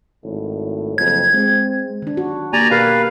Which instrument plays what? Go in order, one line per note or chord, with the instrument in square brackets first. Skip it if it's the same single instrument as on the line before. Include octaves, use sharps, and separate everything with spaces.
[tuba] G#1 [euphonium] A2
[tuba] F#1 [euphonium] F2 [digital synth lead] G#6
[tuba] G#3 [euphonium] C4
[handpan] D#3 D4
F#4
[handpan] A#3 G4 [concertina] D5 G#5 A#5
[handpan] B2 G4 A#4 [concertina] B4 F5